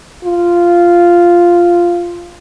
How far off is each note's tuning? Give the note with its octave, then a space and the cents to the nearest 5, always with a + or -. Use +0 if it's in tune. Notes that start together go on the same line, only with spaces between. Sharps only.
F4 -5